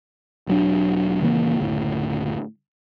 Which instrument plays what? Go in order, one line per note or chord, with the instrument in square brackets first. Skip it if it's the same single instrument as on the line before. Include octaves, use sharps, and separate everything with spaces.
[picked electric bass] E1 F#3 D4
D#1 C#3 E3 A#3
F#1 D2 A2